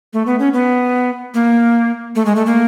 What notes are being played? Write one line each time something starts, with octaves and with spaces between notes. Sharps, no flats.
A3
B3
C#4
B3
A#3
A3
G#3
A3
A#3